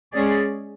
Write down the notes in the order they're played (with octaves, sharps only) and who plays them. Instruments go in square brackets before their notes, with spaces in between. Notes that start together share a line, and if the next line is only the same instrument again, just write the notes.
[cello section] G#3 C#4 G#4 D5